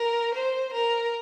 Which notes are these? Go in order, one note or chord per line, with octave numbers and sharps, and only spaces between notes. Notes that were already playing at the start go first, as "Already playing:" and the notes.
Already playing: A#4
C5
A#4